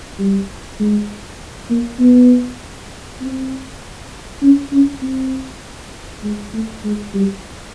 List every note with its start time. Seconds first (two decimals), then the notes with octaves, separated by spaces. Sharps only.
0.19 G3
0.80 G#3
1.70 A#3
2.00 B3
3.21 C4
4.42 C#4
4.73 C#4
5.02 C4
6.23 G#3
6.54 A3
6.85 G#3
7.14 G3